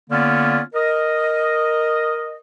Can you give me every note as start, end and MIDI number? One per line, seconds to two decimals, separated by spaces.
0.10 0.60 50
0.10 0.60 58
0.10 0.60 59
0.10 0.60 61
0.10 0.60 65
0.10 0.60 74
0.74 2.37 70
0.74 2.37 75